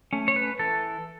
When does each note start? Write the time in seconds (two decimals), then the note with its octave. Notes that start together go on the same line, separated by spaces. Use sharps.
0.13 A3 C#4
0.28 C#5
0.36 B4
0.59 E3 A4